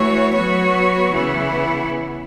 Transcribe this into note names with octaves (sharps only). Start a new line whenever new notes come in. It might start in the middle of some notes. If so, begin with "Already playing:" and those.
Already playing: E3 A3 F#4 C#5
F#3 B3 F#4 C#5
C#3 E3 B3 E4